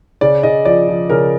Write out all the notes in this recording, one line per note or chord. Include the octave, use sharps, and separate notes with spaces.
C#3 D5
C#3 D#5
F3 D5
F3
C#3 A#4